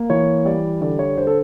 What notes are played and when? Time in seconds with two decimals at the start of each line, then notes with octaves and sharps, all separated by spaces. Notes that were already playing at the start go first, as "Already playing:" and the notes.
Already playing: A#3
0.10 E3 C#5
0.45 G3 D5
0.81 D3 D5
0.99 C#5
1.17 D3 C5
1.27 A4